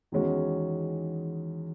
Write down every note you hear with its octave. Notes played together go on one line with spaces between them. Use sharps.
E2 D#3 G#3 C#4 F#4